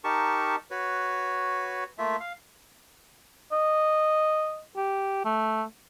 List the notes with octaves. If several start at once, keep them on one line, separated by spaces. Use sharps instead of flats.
D#4 G4 A#4 A5 C#6
F#4 B4 C#5
A3 A#3 F4 E5
F5
D#5
G4
A3